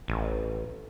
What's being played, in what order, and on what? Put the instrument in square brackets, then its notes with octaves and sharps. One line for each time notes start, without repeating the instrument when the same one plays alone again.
[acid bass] A1